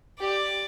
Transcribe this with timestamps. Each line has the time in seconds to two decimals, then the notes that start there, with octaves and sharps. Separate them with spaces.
0.20 G4 D5